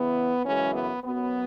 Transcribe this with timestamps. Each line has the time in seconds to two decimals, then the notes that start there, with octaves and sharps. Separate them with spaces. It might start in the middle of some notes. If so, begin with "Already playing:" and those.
Already playing: E2 C#3 E3 B3
0.45 F#2 C#3 E3 G#3 C#4
0.74 B3
1.03 F#2 F#3 B3